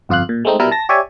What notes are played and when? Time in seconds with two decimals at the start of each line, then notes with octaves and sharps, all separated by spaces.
0.09 G1 F2 F4 F5 F#6
0.29 A#2
0.45 G#3 A3 C4 D#4
0.59 B2 G3 E4 A#4
0.71 A5 A#6
0.89 G4 C#5 D5 E5 G#5